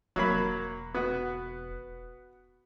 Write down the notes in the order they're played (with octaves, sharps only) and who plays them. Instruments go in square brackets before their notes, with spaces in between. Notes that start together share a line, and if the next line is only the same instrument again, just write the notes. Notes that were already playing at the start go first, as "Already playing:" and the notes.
[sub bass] E1 [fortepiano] F#3 A#3 B5
[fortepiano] B3 F#4